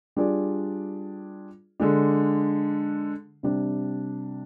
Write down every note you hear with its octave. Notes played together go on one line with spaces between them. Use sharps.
G3 D4 F4 G#4 D5
D3 G#3 D4
C3 G3 D4